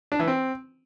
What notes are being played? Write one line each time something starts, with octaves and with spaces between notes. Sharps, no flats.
D4
E3
C4